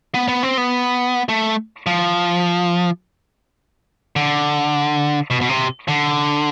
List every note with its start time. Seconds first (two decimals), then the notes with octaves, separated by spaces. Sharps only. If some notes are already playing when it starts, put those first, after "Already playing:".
0.14 B3
0.28 B3
0.43 C4
0.58 B3
1.29 A3
1.86 F3
4.16 D3
5.30 B2
5.41 B2
5.49 C3
5.88 D3